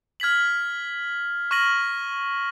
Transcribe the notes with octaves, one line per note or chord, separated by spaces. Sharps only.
F6 G#6 B6 F#7
C#6 F6 A#6 D#7 F#7